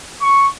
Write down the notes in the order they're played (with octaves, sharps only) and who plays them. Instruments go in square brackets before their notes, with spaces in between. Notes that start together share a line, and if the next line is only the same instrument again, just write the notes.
[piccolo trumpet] C#6